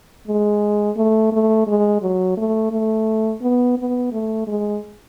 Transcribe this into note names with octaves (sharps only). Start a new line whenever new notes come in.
G#3
A3
A3
G#3
F#3
A3
A3
B3
B3
A3
G#3